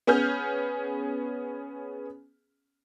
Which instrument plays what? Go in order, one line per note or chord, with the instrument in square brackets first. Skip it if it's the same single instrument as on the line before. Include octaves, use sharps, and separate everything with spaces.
[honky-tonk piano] B3 C#4 G#4 F6 G6